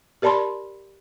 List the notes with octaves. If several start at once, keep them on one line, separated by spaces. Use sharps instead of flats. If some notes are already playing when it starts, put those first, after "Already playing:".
G4 A#4 D5 A5 B5 C6